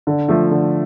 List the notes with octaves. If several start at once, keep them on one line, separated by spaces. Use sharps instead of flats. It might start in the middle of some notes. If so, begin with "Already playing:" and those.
D3
F3 A3
D3